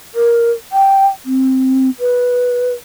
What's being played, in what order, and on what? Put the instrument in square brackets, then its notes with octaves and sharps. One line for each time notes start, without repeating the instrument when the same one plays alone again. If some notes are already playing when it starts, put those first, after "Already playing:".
[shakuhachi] A#4
G5
C4
B4